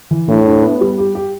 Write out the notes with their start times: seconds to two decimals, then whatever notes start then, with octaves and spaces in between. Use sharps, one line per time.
0.11 E3
0.28 A2 D4
0.45 D4
0.62 B3
0.81 G3
0.98 G4
1.15 G4